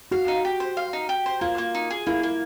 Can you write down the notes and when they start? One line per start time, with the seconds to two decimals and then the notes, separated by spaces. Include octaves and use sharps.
0.11 F#4 F5
0.28 D#4
0.45 G4
0.60 C5
0.77 F5
0.93 D#4
1.09 G4
1.26 C5
1.41 A#3 F4
1.58 A#3
1.75 D#4
1.91 G#4
2.07 A#3 E4
2.23 A#3